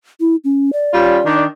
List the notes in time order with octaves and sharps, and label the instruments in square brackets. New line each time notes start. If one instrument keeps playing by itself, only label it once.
[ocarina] E4
C#4
D5
[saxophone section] G3 C#4 F4
D#3 D4